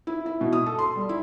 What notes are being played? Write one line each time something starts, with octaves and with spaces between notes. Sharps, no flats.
E4
E4
B2
D#6
A4
C6
G3
E4